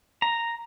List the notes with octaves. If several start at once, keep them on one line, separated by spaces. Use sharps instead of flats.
A#5